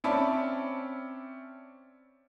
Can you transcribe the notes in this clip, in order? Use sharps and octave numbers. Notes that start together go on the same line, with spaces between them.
C4 C#4 D5 E5 A5 B5